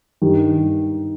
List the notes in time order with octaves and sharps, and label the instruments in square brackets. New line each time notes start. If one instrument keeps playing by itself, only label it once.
[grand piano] G2 D#3 G3